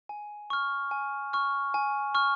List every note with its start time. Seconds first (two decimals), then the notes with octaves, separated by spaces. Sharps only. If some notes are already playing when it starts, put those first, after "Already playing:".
0.09 G#5
0.50 C#6 F6
0.91 G#5
1.33 C#6 F6
1.74 G#5
2.15 C#6 F6